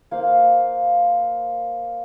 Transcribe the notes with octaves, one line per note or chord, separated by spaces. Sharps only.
A#3 F4 C5 F5